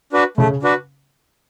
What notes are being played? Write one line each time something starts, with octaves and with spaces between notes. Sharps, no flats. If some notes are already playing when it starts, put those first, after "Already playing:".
D4 F#4 B4
C#3 A3 C#4
D4 F#4 B4